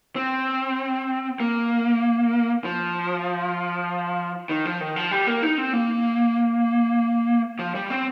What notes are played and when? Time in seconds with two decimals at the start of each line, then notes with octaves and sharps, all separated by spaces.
0.16 C4
1.40 A#3
2.64 F3
4.49 D#3
4.65 F3
4.80 D#3
4.96 F3
5.11 G3
5.27 A#3
5.42 D#4
5.58 C4
5.73 A#3
7.59 F3
7.75 G3
7.90 C4